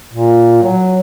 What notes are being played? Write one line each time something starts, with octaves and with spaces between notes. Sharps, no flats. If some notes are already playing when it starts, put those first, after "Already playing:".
A#2
F#3